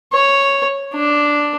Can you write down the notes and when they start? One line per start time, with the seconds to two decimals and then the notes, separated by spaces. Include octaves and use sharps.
0.13 C#5
0.94 D4